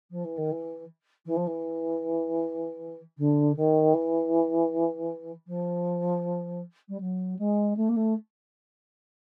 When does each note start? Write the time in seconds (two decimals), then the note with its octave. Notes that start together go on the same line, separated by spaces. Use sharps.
0.10 F3
0.24 E3
0.37 D#3
0.51 E3
1.25 E3
1.36 F3
1.47 E3
3.17 D3
3.56 D#3
3.93 E3
5.47 F3
6.88 G3
7.00 F#3
7.38 G#3
7.76 A3
7.89 A#3
7.96 A3